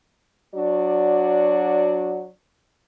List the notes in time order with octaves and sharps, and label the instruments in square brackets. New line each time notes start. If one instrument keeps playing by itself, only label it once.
[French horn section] F#3 D4 F#4 D5